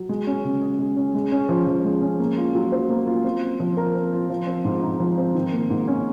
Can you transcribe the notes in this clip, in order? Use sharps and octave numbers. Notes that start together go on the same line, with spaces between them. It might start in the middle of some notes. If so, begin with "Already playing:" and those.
Already playing: F#3
G#3
C#4
C#3
G#4
G#3
C#4
G#3
C#4
F3
F3
G#3
C#4
A#3
F4
F#3
C5
A#3
F4
C4
F4
F3
A#4
C4
F4
F3
C4
G#2
D#4
F3
C4
D#3
A#3
G#2
C#4